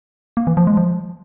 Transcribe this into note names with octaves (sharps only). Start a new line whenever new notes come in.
A#3
E3
F3
G#3
F3